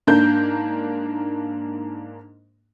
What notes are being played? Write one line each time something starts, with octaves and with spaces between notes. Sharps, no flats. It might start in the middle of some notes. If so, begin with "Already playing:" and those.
G#2 A#3 D4 G6